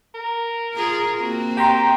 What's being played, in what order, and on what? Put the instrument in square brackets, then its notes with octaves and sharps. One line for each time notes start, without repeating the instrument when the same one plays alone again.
[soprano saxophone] A#4
[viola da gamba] F4 G#4
A#3 C4 F#4
[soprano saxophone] G4 [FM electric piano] G5 A#5 C6